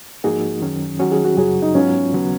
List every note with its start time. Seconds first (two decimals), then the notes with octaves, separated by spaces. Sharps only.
0.24 G#2 F3 A#3 D#4 F#4 G#4
0.62 F#2 D#3 F#3 C#4
0.99 D#3 F#3 C#4 F#4
1.11 G#4
1.24 F#4
1.37 F#2 C#3 F#3 G#4
1.62 D#4
1.75 G#2 F#3 B3 C#4 F4
2.12 D#2 C#3 F#3 B3